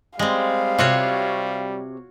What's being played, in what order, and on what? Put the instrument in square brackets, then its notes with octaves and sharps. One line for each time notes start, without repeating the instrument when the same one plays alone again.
[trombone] G3 [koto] G#3 C4 [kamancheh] F5
[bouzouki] C3 [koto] F4 F#4 C#5